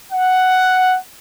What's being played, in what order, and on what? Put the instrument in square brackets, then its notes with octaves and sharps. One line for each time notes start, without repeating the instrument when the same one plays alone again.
[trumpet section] F#5